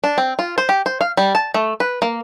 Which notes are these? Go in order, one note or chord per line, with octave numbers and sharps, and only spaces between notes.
D4
C4
F4
C5
G4
C5
F5
G3
A5
A3
B4
A#3